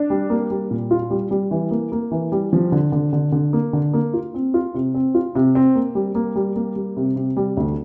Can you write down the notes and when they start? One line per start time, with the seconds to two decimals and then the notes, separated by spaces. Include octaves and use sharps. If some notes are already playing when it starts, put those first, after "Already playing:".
Already playing: D4
0.10 G3
0.30 A#3
0.50 G3
0.71 A#2
0.91 F4
1.10 G3
1.31 G3
1.51 E3
1.71 A#3
1.92 A#3
2.11 E3
2.32 G3
2.53 F3
2.72 D3
2.92 D3
3.13 D3
3.32 D3
3.53 A#3
3.73 D3
3.93 A#3
4.14 F4
4.34 C4
4.54 F4
4.74 C3
4.94 C4
5.14 F4
5.35 C3
5.55 C4
5.75 A#3
5.95 G3
6.15 A#3
6.36 G3
6.56 A#3
6.76 G3
6.97 C3
7.16 C3
7.37 G3
7.57 D2